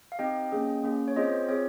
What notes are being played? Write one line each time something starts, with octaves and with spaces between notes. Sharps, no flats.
F5
C4 D#4 G4 D#5 G5
A#3 C#4 G#4
A#3 C#4 G#4
C#5
C4 F4 G#4 C5 D#5
C4 F4 G#4 C#5